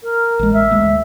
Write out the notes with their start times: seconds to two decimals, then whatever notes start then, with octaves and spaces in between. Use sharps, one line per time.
0.03 A#4
0.39 A1 G#3
0.53 E5
0.71 D2 G#3 A3